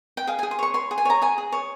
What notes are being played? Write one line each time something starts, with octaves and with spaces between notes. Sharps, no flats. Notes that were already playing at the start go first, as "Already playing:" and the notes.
G5
G#4 F5
G#5
G#4
C6
C#5 C#6
C#5 C6
G#4
G#5
C#5 A#5
G#4 G#5
G#4
C#5